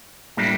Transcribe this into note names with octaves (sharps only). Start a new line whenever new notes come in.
A2 G3 A#3 D4